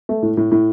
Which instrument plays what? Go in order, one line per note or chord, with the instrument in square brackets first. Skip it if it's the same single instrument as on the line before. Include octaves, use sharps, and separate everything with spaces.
[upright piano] A3
A2
A2
A2